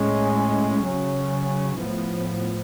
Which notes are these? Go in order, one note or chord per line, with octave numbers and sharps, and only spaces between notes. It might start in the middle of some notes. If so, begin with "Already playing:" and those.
Already playing: A2 G#3 C#4
C#3 F#3 C#4
A2 F3 B3